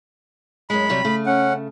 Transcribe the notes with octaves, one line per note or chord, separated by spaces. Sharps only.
F#2 G#3 B5
C3 F#3 G3
C#3 A3
C#4 F#5